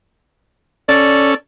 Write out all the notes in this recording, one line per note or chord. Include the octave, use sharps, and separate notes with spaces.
C#4 A4 D5